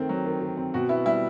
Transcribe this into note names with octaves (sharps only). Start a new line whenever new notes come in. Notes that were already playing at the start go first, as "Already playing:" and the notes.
Already playing: D#3 A3 C4
F#3
D#3
D#3
C4
B2 F#4
B3 E4
G3 E4